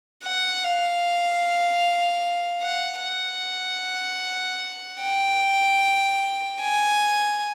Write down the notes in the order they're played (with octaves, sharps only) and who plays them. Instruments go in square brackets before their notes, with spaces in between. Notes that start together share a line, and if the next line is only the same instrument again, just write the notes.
[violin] F#5
F5
F#5
F#5
G5
G#5